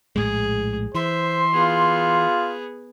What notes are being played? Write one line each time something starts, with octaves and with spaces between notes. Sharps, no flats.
A#1 A2 G#3 G#4
E3 C5 E5 C6
B3 F4 G#4